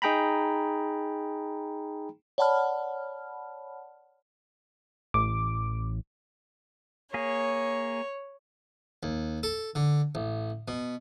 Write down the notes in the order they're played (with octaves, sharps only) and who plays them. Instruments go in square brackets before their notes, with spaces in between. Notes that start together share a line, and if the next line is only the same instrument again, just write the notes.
[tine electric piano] D#4 G#4 G5 A#5 B5
[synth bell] C#5 D5 F#5 A5 B5 F6
[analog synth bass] A1 [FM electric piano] D6
[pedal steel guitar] A#3 G#4 [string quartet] C#5
[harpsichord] D#2
A4
D3
A1
B2